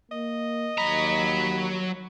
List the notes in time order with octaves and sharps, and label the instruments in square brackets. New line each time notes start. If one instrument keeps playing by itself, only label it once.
[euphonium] A#3 [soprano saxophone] D#5
[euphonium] D#2 [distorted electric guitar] F#3 A#5 [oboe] B5